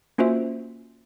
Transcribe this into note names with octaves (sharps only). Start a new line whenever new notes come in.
A#3 C#4 F4 F#4 C5 E5